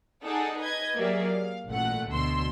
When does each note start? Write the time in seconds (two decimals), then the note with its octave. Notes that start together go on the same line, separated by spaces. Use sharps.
0.24 D#4 G#4 A4 D5 F#5
0.59 B4 D#5 G#6
0.97 F#3 A#3 G4 G#4 D5 E5
1.28 F5
1.67 A1 A#2 A3 F#5
2.09 D2 B2 C6 E6